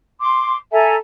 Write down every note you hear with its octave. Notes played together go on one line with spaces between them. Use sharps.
C6 D6
A4 E5 G#5 A#5